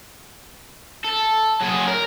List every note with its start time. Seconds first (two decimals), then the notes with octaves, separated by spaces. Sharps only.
1.05 A4
1.62 F#3 G#4
1.87 A#4